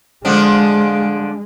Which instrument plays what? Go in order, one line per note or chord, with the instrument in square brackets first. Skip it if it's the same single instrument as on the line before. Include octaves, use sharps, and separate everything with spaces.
[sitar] D3 F3 D4 [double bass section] G#3